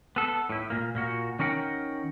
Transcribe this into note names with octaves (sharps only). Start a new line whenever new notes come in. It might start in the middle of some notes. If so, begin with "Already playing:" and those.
B3 A4
A2 E4
A#2 A#3
A#2 A#3 F#4
D#3 C#4 A#4 F#5 G5